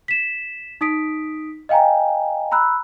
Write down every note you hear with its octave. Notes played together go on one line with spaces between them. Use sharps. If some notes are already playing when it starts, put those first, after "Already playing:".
B6 E7
D#4 D#6 B6 D7
D#5 F5 G5 G#5 A#5
A#5 B5 E6 F#6